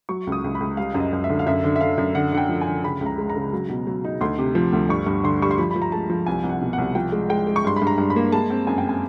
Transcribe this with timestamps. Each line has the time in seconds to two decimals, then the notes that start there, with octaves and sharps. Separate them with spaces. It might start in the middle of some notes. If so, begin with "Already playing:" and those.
0.09 F#3 C#6
0.27 C#2
0.32 D#6
0.44 C#2
0.55 B5
0.60 C#2
0.77 G3 F5
0.94 F#2
1.00 D#5
1.13 F#2
1.24 E5
1.30 D3
1.39 F5
1.47 F#2 E5
1.64 D3
1.76 E5
1.81 D3 F5
1.98 F#2
2.15 D3 F#5
2.32 D3 F#5
2.37 G5
2.49 F3
2.61 G#5
2.67 D3
2.84 C#3 B5
3.01 C#2
3.06 A#5
3.18 G#3
3.30 A#5
3.36 C#3
3.53 F#3
3.69 B2
3.87 F#3
4.05 D#4
4.21 D2 C6
4.39 C3
4.55 F3
4.73 D2
4.89 G2 C#6
5.06 G2
5.24 D3 C6
5.42 G3 C#6
5.51 C6
5.58 F3 B5
5.71 B5
5.76 F3
5.82 A#5
5.92 G#3 A5
6.10 F3
6.26 C2 G#5
6.44 C2
6.49 F#5
6.61 B2
6.73 F#5
6.78 C2
6.95 F3 G5
7.12 G#3
7.30 G#3 G5
7.47 G#3
7.56 C#6
7.65 G2 C6
7.76 B5
7.82 G2
7.87 A#5
7.98 G2
8.10 B5
8.16 A#3
8.32 G#3 A5
8.50 C4
8.67 F#2 G#5
8.78 G5
8.84 C4 G#5